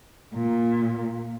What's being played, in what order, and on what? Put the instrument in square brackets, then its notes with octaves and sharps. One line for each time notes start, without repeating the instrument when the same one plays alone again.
[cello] A#2